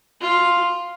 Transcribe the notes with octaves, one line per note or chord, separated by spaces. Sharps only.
F4